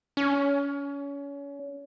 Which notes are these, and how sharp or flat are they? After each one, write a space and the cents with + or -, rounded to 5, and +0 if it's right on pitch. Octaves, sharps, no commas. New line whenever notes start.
C#4 +30